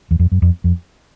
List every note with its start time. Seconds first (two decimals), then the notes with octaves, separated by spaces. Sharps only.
0.11 E2
0.19 F2
0.32 F#2
0.42 F2
0.64 F2